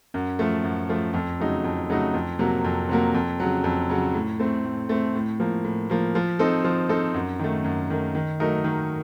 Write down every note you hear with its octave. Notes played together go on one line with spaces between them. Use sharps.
F#2
F3 A3
F#2
F3 A3
F2
C#3 F#3 A3 D#4
F2
C#3 F#3 A3 D#4
F2
C3 F#3 A#3
F2
C3 F#3 A#3
F2
C#3 F#3
F2
C#3 F#3
A2
A3 C4
A2
A3 C4
A2
F3 A#3
A2
F3 A#3
F3
C4 D#4 A4
F3
C4 D#4 A4
F#2
D#3 A3
F#2
D#3 A3
D#3
F#3 A3 D#4 A#4
D#3